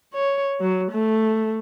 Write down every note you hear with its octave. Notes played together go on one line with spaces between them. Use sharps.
C#5
F#3
A3